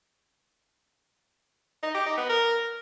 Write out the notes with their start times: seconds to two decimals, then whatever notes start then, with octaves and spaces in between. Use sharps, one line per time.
1.83 D#4
1.95 G4
2.06 D#4
2.18 B3
2.29 A#4